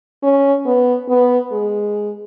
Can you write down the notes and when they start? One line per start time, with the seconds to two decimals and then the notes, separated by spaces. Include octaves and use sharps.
0.23 C#4
0.66 B3
1.09 B3
1.52 G#3